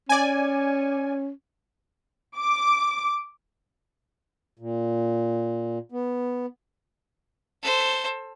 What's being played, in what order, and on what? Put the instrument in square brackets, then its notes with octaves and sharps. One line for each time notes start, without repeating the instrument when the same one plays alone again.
[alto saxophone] C#4 [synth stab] D5 G#5
[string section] D6
[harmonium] A#2
B3
[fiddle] A4 C5